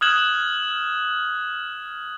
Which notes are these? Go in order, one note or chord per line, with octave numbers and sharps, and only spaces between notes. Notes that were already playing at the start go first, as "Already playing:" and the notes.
D#6 F6 F#6 G#6 E7 F#7